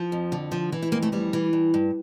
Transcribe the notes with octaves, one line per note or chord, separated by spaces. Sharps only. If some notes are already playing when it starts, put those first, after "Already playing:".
Already playing: F3
F2
D3
F3
E3
E4
F2 A#3
A3
E3 G3
E3
G2
G2